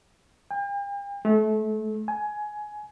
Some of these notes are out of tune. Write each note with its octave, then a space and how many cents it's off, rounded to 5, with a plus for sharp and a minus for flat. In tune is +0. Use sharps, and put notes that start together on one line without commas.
G5 +45
A3 -30
G#5 +15